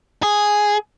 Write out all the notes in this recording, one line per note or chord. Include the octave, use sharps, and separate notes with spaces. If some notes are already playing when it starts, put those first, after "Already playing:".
G#4